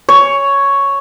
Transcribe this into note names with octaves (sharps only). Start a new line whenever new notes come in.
C#5